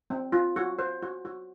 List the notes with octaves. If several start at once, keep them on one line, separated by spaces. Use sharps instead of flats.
C4
F4
F#4
C5
F#4
F#4